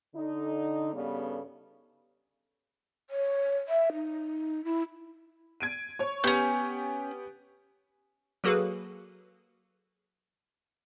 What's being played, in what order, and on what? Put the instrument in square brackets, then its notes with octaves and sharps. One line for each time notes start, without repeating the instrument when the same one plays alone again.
[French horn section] D3 D#4
G2 C#3 G3 B3 A4 D5
[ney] C#5
E5
D#4
E4
[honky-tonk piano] G#6 D7 D#7
C#5 C#6
[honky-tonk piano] B3 G4 [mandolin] C#4 G6
[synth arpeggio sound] F#3 A#3 F#4 G#4 A4 B4